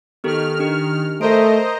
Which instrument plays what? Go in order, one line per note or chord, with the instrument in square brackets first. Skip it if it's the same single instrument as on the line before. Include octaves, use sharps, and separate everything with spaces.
[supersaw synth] D#3 F6 [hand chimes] B3 G4 A4
[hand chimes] D4 G4
[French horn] A3 [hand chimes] A#4 D7 [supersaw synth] C5 D#5 A#5